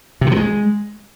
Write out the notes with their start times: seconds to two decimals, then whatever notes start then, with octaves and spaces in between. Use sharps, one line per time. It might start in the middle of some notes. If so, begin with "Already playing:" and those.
0.21 C3
0.26 D3
0.32 F3
0.37 G#3